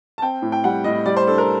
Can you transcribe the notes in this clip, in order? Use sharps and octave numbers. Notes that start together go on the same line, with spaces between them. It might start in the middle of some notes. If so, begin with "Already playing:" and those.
A5
C4 G5
A2
G5
G3 F#5
A2 D#5
G3 D5
C5
D4 A4
A#4